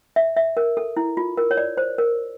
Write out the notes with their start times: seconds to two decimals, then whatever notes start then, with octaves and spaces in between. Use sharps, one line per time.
0.16 E5
0.36 E5
0.57 A#4
0.77 A4
0.97 E4
1.17 F4
1.37 A#4
1.51 C#5
1.57 D5
1.77 C5
1.98 A#4